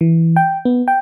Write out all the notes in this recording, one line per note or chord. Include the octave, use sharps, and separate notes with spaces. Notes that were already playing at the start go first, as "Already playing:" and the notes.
E3
G5
B3
G5